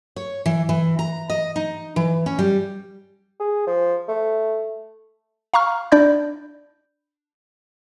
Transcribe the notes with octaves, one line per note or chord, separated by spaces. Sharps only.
C#5
E3
E3
A#5
D#5
D#4
E3
C#4
G3
G#4
F3
A3
F5 A#5 C#6 F6
D4 D5 B5 G6